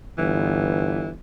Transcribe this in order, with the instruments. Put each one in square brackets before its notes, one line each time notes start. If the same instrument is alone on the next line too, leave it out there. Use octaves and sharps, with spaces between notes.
[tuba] G1 [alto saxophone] E3